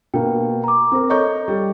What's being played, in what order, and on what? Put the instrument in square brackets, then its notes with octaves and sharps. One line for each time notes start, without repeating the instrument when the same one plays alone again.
[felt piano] B2 A#3 [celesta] G5
[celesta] A#5 D6
[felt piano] C4 A#4
[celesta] A4 C#5 D#5 [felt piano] A#5 C#6 G6
[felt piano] G3